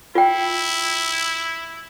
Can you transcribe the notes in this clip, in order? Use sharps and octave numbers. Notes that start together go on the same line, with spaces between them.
E4 F4 G5